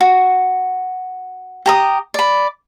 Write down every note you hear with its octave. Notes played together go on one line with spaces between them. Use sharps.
F#4
G4 A#5 D#6
D5 B5